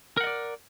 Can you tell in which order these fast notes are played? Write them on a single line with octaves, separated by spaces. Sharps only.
A#4 F#5 D#5 D5